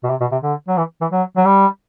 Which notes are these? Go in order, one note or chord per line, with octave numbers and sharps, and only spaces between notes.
B2
C3
B2
C3
D3
F#3
E3
E3
F#3
F#3
G3